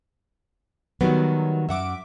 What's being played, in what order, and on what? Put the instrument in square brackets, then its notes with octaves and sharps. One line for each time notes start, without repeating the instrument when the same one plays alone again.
[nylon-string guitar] D#3 G3 B3 [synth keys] F#3
[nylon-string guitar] F#2 F#5 [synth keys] E5 D6